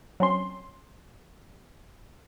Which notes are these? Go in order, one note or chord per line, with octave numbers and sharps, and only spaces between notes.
F#3 C4 C#4 C6